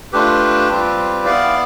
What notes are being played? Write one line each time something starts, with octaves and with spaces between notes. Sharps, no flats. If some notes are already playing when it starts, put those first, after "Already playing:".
A3 D4 F4 G4 B4
G3 C4 F4
B3 E4 D5 F5